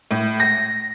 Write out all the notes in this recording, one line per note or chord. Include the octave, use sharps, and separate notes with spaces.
A2
A#6